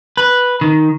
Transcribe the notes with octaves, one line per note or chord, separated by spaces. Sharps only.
B4
D#3